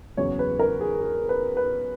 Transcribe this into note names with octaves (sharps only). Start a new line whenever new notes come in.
F#1 E2 C#3 F#3 C#5
B4
A#4
G#4
G#4
B4
B4